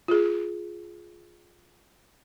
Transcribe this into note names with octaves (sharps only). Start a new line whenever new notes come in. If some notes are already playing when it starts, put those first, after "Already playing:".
F4 G#4